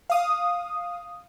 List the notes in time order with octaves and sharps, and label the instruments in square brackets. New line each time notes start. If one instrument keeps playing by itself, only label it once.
[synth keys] F5 D#6